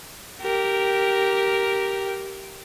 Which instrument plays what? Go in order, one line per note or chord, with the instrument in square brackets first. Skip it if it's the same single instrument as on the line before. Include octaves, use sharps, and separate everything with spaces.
[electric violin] G4 A#4